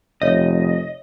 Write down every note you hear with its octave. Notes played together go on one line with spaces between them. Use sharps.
F1 C#5 D#5 E5